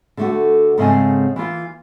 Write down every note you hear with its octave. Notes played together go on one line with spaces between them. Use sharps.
D3 A3 F#4
G#2 C#3 A3 C4 D#5 G#5
E3 A#3 F4